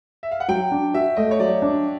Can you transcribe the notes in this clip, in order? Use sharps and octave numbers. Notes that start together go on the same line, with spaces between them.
E5
F5
F#5
F#3 G5
D4
F#4 E5
A3 D#5
C#5
F#3 D5
D4